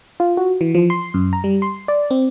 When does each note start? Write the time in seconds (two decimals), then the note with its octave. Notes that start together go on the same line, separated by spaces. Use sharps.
0.20 F4
0.37 F#4
0.61 E3
0.75 F3
0.90 C6
1.14 F#2
1.33 A#5
1.44 G3
1.62 C6
1.88 D5
2.11 C4